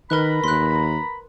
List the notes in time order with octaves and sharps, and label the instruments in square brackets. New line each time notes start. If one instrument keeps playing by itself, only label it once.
[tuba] D#3 [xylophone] A#4 B4 F#6 [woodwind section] A#5 B5
[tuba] D#2 [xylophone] C6 F#6